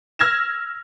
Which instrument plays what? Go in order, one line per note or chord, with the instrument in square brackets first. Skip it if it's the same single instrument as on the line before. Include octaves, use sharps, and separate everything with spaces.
[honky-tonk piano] E6 F6 G#6 A#6 E7